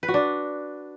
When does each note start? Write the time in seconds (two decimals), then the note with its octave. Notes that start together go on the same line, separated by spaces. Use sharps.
0.03 B4
0.08 F#4
0.14 D4